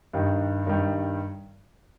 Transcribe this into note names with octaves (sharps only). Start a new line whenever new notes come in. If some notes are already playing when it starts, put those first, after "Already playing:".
G2 D#3 G3
G2 D#3 G3